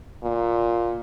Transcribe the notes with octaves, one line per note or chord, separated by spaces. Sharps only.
A#2